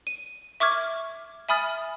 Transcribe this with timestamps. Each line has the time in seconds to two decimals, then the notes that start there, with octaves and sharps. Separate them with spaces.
0.07 D#7
0.60 E5 C#6 D6 F6 G#6
1.49 E5 G#5 B5 D#6 F6 A6